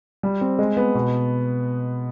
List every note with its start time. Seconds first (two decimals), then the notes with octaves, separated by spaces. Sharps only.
0.23 G3
0.41 C4
0.59 G#3
0.77 B3
0.95 B2